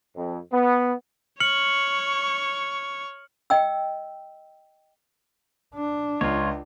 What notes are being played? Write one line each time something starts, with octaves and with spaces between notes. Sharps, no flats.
F2
B3
C#5 C#6 F6 C#7 F#7
D#5 G5 E6
D4
C#2 F4 C#5